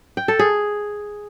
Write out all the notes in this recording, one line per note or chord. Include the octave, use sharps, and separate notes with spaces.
G5
A4
G#4